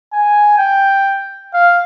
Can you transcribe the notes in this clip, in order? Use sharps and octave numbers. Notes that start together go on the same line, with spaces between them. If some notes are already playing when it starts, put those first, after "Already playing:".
G#5
G5
F5